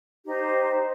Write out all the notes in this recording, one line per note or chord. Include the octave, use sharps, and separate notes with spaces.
D#4 G4 C5